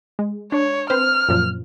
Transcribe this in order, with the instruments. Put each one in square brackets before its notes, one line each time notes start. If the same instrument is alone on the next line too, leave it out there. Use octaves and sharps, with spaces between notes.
[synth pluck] G#3
[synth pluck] D4 [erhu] C#5
[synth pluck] C4 B4 C5 [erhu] F6
[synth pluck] F#2 A#2 F3